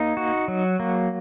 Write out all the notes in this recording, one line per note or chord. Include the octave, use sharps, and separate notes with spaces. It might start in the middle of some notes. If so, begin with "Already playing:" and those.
Already playing: A#3 D#4
F#4
F#3
A#3